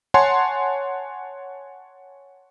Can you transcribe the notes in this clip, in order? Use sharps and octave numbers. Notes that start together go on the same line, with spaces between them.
C#5 F#5 G#5 A5 C6